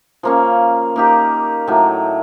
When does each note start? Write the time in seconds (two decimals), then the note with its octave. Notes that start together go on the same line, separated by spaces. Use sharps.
0.23 F3 A#3 C#4
0.96 A#3 D#4 G4
1.67 A2 F#3 A3